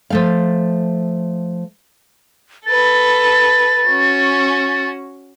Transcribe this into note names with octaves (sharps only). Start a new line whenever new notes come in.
F3 A3 F5
A4 B4 A6
C#4 F#4